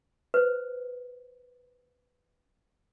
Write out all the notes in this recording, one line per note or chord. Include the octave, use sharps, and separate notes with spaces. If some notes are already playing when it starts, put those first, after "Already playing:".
B4 C5